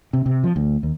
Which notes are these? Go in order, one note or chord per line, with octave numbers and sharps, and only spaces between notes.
C3
C3
F3
D2
D#2